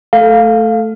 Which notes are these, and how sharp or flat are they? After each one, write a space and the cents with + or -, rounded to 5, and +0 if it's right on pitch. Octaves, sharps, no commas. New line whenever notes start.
A3 -5 A4 +0 F5 +0